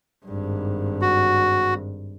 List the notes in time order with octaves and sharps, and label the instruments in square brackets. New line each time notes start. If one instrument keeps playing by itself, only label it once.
[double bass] G#1 G2
[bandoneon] F#4